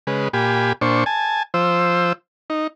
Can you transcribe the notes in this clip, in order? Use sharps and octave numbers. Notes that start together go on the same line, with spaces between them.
C#3 G#3 B4
A#2 G4 G#5 B5
A#2 D4 C5 C#6
G#5 A5
F3 C5 E6
D#4